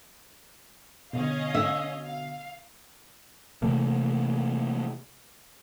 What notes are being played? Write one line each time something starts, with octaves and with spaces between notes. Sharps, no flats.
B2 D3 C#4 D#5 F5
E5
F5
C3 E3 A3 A#3